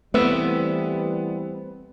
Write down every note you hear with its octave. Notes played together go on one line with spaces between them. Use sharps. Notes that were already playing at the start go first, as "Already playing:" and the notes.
E3 G3 A3 B3 C4 B4 E5